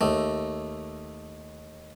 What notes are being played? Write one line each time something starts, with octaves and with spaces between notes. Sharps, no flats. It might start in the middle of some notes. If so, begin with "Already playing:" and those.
D#2 A3